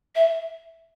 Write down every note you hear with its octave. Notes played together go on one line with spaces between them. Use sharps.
E5